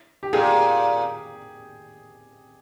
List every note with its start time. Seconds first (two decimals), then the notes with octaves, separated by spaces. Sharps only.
0.23 G4
0.33 A#2 G#4